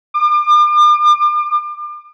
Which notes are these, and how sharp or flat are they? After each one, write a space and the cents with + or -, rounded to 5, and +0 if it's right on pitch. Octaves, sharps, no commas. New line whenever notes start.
D6 +40